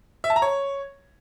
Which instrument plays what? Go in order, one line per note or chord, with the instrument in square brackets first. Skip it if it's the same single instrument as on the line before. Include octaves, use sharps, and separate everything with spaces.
[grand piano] E5
A5
A#5
C#5